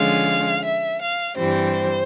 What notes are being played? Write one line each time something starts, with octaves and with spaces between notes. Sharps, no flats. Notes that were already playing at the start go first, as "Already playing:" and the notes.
Already playing: D3 F3 G#3 C#4 F5
E5
F5
G2 E3 G3 C4 C5